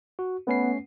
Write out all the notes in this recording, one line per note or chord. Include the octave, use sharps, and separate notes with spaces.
F#4
A3 B3 C#4 C7